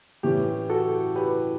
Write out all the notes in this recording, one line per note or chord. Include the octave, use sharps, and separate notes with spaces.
A2 E3 A3 C#4 G4
F#4 A4
G4 B4